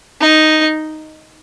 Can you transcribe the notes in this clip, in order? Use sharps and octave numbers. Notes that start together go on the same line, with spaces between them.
D#4